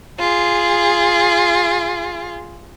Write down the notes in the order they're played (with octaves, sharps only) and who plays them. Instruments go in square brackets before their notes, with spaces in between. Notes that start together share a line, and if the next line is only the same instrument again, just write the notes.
[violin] F4 G#4